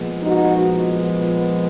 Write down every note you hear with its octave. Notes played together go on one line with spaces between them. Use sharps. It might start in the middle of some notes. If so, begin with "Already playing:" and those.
Already playing: A#2 F3 G#3 B3
D#4 F#4